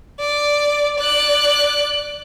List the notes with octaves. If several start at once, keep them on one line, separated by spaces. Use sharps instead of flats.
D5
D5 F#6